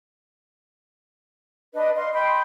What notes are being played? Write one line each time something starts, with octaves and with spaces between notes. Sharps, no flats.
D4 B4 D#5
D#5 F5 C6
D#5 G5 B5 C6